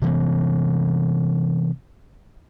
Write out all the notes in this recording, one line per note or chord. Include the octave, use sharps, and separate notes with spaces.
C3 E3 B3